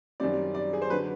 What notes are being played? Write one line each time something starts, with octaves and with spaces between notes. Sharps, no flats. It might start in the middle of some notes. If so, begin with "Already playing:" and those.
F#2 D#3 G3 C4 D5
D5
G#4
C5
D3 F#3 B4